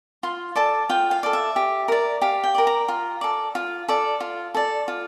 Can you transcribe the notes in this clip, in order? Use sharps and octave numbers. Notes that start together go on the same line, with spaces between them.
F4 C6
A4 D5 A5
F4 G5
F5
A4 D5
E5
G4
A#4 D5
G4 F5
G5
A#4 D5
A#5
F4
A4 D5
F4
A4 D5
F4
A4 D5
F4